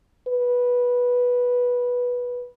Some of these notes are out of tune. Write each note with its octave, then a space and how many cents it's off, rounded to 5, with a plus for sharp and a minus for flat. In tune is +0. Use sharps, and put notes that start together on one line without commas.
B4 -10